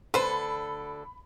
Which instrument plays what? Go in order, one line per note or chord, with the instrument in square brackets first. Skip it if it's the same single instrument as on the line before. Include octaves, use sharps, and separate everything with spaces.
[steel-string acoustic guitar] D2 D3 A4 [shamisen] B4 C5 [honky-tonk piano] B5